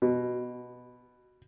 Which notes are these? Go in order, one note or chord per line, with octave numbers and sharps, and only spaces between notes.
B2